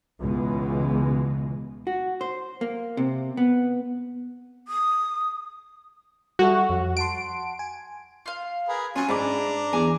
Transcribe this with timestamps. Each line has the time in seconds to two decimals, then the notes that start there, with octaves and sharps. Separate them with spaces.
0.20 C#2 B2 E3 G#3
1.87 F#4
2.21 C5
2.61 A#3
2.97 C3
3.37 B3
4.68 D#6
6.39 G3 F#4 A4 E5
6.69 F2
6.97 F#5 A5 C6 D7
7.59 G#5
8.26 F4 F5
8.69 G#4 A#4 B4
8.96 F#3 C#4 F4 G#4 G#5
9.09 G#2 D4 E4 A#5 D6
9.73 E2 G#5 D6